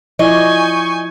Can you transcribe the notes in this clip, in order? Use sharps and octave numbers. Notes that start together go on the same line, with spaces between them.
F3 E4 D5 D#5 G#5 C#6 G6